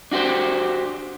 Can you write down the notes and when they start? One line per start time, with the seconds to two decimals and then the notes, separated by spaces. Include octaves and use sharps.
0.11 D4 F#4 G4 C5